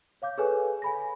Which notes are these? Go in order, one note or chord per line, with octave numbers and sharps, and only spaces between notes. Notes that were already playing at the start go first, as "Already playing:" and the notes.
C#5 F5 D6 G6
G#4 A4 B4 C#5 G#5
G#5 B5 A#6